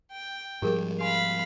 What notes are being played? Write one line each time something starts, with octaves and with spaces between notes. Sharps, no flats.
G5
G#2 F3 G3 G4 G#4 A#4
F5 G#5 B5 C6